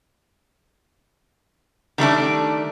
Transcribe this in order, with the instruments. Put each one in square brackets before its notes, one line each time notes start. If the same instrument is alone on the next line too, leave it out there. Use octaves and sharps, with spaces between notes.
[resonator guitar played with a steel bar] D#3 G3 A3 D4